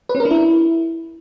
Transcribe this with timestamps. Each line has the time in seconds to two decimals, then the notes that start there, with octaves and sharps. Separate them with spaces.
0.09 B4
0.15 C#4
0.20 A#4
0.25 D4
0.31 E4